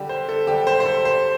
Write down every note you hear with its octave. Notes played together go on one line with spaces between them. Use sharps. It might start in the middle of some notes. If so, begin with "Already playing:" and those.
Already playing: D3 G3 G4
C5
A4
D3 G3 G4
C5
C5
A4
C5